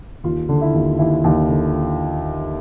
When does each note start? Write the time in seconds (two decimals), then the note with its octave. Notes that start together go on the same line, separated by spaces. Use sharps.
0.24 D#2 F4
0.49 D3
0.61 E4
0.74 D#2
0.99 D#2 E4
1.24 D#2
1.49 D3